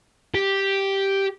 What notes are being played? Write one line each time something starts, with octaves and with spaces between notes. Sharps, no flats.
G4